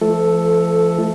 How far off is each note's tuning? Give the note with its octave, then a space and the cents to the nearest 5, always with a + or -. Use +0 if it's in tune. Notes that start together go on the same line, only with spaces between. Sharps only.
F3 -35 A3 -15 A4 +0